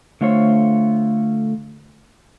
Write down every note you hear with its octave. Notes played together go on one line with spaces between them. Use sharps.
D3 A3 F4 C5 C#5